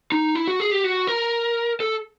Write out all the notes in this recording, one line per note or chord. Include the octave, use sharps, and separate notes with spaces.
D#4
E4
F#4
G#4
G4
F#4
A#4
A4